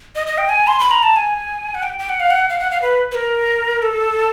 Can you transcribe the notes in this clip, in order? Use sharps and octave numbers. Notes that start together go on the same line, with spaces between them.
D#5
D#5
G5
G#5
C6
B5
A#5
A5
G#5
F#5
G5
G5
F#5
F5
F#5
F5
F#5
F5
B4
B4
A#4
A4